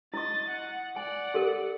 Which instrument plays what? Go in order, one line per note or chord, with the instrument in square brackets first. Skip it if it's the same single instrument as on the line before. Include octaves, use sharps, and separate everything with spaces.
[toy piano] E4 C#6 [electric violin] D#5 A6
[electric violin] F#5
[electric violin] D5 F#5 [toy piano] G#5
[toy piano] G4 A4 A#4